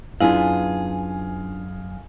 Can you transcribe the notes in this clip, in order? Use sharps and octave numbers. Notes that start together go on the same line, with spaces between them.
F#2 B3 D4 E4 F4 G#4 F5 G#5